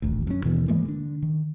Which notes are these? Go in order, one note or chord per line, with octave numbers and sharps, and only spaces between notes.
D#1 A1 D2
F#2 C#4
D#2 B2 E3 B3
G#2 E3 G#3 A#3
D3 D4
D#3